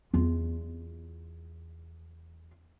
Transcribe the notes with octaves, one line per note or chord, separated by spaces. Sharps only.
E2 F4